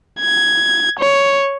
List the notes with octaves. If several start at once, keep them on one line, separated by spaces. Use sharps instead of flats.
G#6
C#5